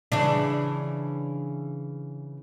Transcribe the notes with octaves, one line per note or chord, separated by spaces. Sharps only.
C#3 E3 D4